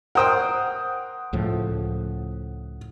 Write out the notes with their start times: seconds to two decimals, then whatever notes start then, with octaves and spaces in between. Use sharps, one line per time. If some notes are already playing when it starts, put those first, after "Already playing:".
0.15 A#4 C5 F#5 G5 D#6
1.33 C#2 A2 F3